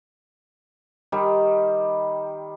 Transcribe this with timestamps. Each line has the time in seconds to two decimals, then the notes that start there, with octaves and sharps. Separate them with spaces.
1.12 D#3 G3